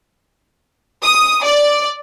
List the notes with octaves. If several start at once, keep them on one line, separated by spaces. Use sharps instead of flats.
D#6
D5